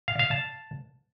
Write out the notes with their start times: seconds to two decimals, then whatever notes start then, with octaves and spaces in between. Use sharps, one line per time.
0.08 F5
0.19 F5
0.31 A5